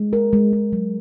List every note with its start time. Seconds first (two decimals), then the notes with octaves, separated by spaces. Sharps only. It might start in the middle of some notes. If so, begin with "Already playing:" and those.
Already playing: G#3
0.13 A#4
0.33 G#3
0.53 G#3
0.73 F#3